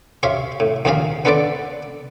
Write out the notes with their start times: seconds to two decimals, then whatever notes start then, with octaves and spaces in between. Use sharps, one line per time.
0.23 G4 C5 C#5 E5 F5
0.60 A2
0.85 D#2 A#2 F3 G4 G#4 F5
1.25 B3 D4 A4 B4 C5 D5